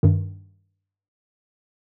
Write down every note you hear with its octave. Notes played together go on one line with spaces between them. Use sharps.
G2 D#3